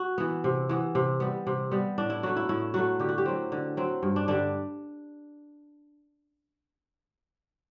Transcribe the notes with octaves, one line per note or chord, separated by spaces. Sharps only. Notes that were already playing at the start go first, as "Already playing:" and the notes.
Already playing: F#4
E3 B3
C3
E3 B3
C3
G3 B3
C3
G3 B3
A2 D4
E4
F#3 A3 F#4
E4
A2 E4
F#3 A3 F#4
D3 G4
F#4
G4
F#3 C4
D3
F#3 C4
G2
D4
D3 G3 D4